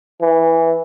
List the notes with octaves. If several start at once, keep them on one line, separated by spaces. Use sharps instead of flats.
E3